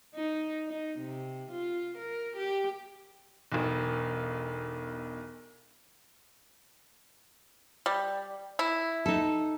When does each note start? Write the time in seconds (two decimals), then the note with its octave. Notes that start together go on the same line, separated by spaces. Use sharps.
0.14 D#4
0.68 D#4
0.99 C3
1.51 F4
1.97 A#4
2.37 G4
3.52 E1 B1
7.86 G3
8.59 E4
9.06 D#4 A4